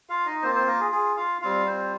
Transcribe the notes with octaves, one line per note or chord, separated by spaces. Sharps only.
F4 F5
D#4 D#5
A#3 C4 F4 C5
C4 C5
A#3 A#4
G#4
G#4
F4 F5
G3 C4 F4 F5
C4 C5